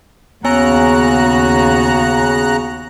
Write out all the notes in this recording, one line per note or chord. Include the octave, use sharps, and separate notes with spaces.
D#2 C#3 B3 F#4 C#5 G#5 A#5 F#6